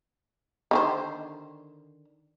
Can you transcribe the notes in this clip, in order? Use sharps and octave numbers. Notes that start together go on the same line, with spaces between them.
D3 D#3 C5